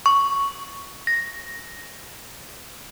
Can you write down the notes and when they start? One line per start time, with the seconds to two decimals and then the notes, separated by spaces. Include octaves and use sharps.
0.06 C#6
1.07 A#6